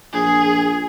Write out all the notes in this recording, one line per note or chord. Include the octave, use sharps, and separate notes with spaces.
A#1 G#4